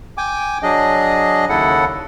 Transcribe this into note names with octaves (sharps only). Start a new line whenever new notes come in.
G5 G#5 D6
F#3 D4 G#4 D#5
D#2 C#3 E4 A4 F#5